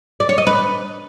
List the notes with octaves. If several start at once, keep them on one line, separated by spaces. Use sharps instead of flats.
D5
C#5
D#5
B4